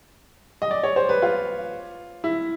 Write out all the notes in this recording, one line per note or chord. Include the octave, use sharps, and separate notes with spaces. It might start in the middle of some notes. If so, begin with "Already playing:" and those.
D#5
D5
C#5
C5
B4
F4
E4